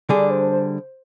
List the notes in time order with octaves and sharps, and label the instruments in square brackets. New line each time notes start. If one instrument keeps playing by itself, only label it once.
[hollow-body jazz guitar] D3 G3 D4 G#4 [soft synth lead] D5
[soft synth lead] C5
C5